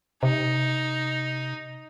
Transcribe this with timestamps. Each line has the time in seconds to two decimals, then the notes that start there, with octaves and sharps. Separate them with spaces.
0.23 C3 D#4